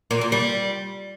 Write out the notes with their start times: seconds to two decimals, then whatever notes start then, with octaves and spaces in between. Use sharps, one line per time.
0.11 A#2
0.21 A#2
0.32 G3